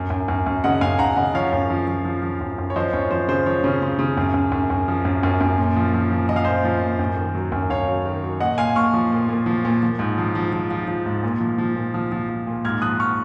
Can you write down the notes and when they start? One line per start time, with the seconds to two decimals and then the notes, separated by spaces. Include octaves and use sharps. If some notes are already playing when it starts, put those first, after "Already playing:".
Already playing: F#2
0.10 F#2
0.28 F#2
0.46 F#2
0.64 C#3 D#5 F#5
0.81 F#2 F5 G#5
0.99 F#2 F#5 A#5
1.16 C#3 D#5 F#5
1.34 F3 C#5 F5
1.53 F#2
1.70 F3
1.87 F3
2.05 F3
2.23 F3
2.41 F#2
2.58 F#2
2.70 C#5
2.76 F3 C5 D#5
2.93 F#2 C#5
3.11 F3 C5
3.28 C#3 C5
3.46 F3 C#5
3.64 C#3
3.82 C#3
3.99 C#3
4.17 F#2
4.34 F#2
4.52 F#2
4.70 F#2
4.88 F3
5.05 F#2
5.23 F#2
5.41 F#2
5.58 A#2
5.76 F3
5.94 F3
6.11 F3
6.29 F3 D#5
6.36 F5
6.44 A#2 C5 D#5
6.65 F3
6.82 A#2
6.99 F#2
7.17 D#3
7.35 F#3
7.52 F#2
7.70 F#2 C#5 F5
7.88 F#3
8.05 D#3
8.23 F#3
8.40 A#2 D#5 F#5
8.58 A#2 F5 G#5
8.76 A#2 C#6 F6
8.94 F3
9.12 A#2
9.29 A#2
9.46 F3
9.65 A#2
9.83 F3
9.99 G#2
10.18 F3
10.35 F3
10.53 F3
10.71 F3
10.88 F3
11.06 G#2
11.23 A#2
11.40 F3
11.58 F3
11.76 A#2
11.94 F3
12.12 F3
12.29 F3
12.47 A#2
12.65 G#2 F6 G#6
12.82 F3 D#6 F#6
13.00 C#6 F6